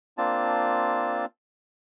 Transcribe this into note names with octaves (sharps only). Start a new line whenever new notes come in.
A#3 C4 D4 F4 A5